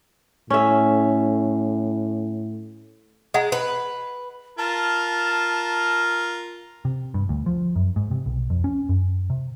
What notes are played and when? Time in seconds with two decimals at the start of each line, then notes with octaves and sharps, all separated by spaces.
0.50 A2 C#4 E5
3.34 G#3 D#5 F#5 A#5
3.52 B4
4.58 F4 A#4 A5
6.85 C3
7.14 G2
7.29 D2
7.46 F3
7.76 F#2
7.96 G#2
8.11 C3
8.26 B1
8.50 F2
8.64 C#4
8.89 F#2
9.30 C3